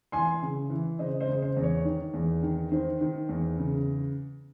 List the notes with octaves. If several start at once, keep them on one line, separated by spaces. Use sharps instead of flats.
E3 G#5 C6
C#3
E3
C#3 C5 D#5
C5 D#5
C#3
C5
E2
C#5
D#3
E2
D#3
D#3 C5
D#3
E2
C#3